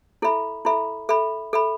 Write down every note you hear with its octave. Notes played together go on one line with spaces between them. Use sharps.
E4 A4 E5 B5
E4 A4 E5 B5
A4 E5 B5
A4 E5 B5